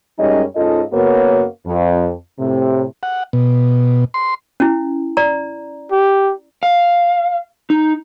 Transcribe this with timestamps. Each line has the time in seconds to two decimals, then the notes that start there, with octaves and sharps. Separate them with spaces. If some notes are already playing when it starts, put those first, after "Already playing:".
0.19 F#2 G3 G#3 C#4 D#4 D#5
0.56 G#2 C#4 F4 A4 D#5
0.93 F#2 C#3 A#3 B3 F#4 C#5
1.66 F2
2.40 A2 C3
3.03 F#5
3.33 B2
4.14 C6
4.60 C#4 E4
5.17 D5 A#5
5.92 G4
6.63 F5
7.70 D#4